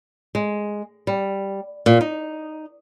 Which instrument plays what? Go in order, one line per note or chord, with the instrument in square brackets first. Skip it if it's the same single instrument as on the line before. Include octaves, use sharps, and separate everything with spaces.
[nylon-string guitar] G#3
G3
A#2
D#4